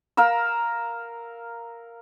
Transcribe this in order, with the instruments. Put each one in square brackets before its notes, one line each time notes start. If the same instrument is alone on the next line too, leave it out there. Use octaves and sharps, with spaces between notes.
[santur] A#4 F5 A#5 E6